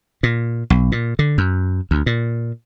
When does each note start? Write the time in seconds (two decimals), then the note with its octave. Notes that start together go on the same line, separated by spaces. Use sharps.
0.23 A#2
0.70 B1
0.92 A#2
1.19 D3
1.38 F#2
1.91 D2
2.06 A#2